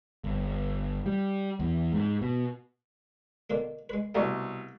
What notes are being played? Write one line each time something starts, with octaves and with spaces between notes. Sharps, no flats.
G1
G3
E2
G#2
B2
B2 D3 A#3
G#3 B4
C2 G2 B2 G3 A3